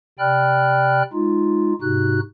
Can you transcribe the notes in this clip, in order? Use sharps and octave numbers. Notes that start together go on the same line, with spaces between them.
C3 D5 G5 B5 F6 F#6
G#3 D#4 F4
G#2 C3 D#4 F#4 F#6